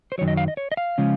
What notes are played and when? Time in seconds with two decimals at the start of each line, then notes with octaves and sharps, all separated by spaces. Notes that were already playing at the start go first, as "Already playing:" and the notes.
0.12 C5
0.18 F#2 D#3 F#3 C#5
0.28 D#5
0.37 F5
0.48 D#5
0.57 C#5
0.72 D#5
0.77 F5
0.98 C#3 F3 G#3 C#4